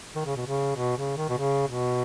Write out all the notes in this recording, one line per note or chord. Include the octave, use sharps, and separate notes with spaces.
D#3
C#3
B2
C#3
B2
C#3
D#3
B2
C#3
B2